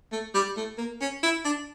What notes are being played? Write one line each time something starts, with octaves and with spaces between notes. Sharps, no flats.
A3
G3
A3
A#3
C#4
E4
D4